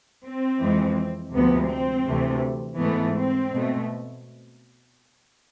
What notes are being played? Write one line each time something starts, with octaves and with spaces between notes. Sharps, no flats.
C4
F2 E3 G#3
D2 C3 F3 G#3 B3
C4
D2 C3 E3 A3
G#2 E3 A3 B3
C4
B2 A3